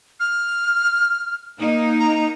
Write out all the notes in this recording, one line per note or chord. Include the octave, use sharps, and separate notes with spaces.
F6
A#3 D#4
A#5